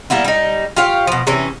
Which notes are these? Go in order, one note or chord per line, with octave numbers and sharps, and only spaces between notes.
G3 A#3 B3 E4
G3 D#4
F4 G4 C#5 F5
B2 F3
C3 E3 C#4